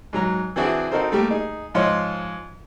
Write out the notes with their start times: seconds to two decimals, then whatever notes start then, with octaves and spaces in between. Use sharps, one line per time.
0.13 G#2 F#3 A#5
0.56 E3 C4 D4 E4 F#4 G#4
0.91 C4 D#4 F#4 A4 A#4 C5
1.12 G3 A3 A#3 G4
1.31 D#4 G#4
1.75 G#2 F3 C#5 D#5 C6